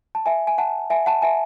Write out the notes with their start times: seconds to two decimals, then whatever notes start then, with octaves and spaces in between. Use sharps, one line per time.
0.15 A5
0.26 E5 G#5
0.47 G#5
0.58 F#5 A5
0.90 E5 G#5
1.06 F#5 A5
1.22 E5 G#5